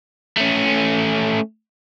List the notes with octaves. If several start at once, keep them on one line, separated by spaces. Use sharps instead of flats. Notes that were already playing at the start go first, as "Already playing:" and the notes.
A3 C#4